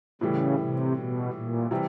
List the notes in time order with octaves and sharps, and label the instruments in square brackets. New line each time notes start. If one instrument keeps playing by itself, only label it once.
[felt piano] A2 E3 G3 [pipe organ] C#3
[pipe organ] C3
B2
A#2
[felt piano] C3 E3 G3